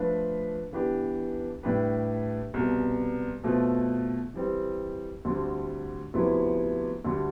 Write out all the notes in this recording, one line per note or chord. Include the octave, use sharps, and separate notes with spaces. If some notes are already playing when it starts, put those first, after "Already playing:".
Already playing: F3 A3 D4 F4 B4
E3 B3 D4 G4
A2 G3 D4 G4 B4
C2 B2 B3
B2 A3 C4 F4 A4
E3 G3 C4
D2 D3 G3 C4
D2 C3 F3 B3 E4
D2 D3 G3